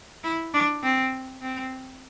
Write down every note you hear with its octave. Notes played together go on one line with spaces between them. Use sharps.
E4
D4
C4
C4